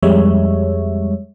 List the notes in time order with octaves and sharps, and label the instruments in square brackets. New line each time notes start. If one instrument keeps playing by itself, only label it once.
[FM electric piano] F2 G3 G#3 C#5 E5